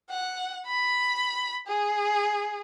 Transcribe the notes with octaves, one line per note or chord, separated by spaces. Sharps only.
F#5
B5
G#4